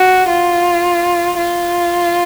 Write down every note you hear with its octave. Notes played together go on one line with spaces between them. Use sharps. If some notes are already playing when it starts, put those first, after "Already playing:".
Already playing: F#4
F4
F4